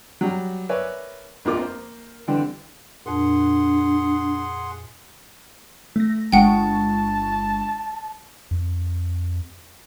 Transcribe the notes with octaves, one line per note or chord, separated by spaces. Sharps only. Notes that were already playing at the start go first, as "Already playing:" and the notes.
F#3 G3
A#4 B4 C#5 D5 E5 G#5
A#1 F2 A#3 F4 A#4 D6
A#3 C5
D3 E3 G3 C4 D4
F2 A#2 D4 G#4 F#5 C6
A3 A#6
G1 G#3 F#5 G5 A5 C#6
F2